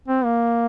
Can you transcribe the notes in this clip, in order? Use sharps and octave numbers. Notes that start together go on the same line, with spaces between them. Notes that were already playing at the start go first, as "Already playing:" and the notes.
C4
A#3